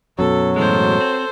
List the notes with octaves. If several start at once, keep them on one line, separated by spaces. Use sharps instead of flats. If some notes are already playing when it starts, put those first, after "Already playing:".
F#2 B2 F#3 A4
A2 E3 G#3 A4 C5
C4